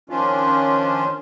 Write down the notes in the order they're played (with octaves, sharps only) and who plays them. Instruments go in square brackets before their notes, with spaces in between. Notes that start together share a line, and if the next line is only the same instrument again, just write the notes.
[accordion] D#3 F3 C#4 D4 F4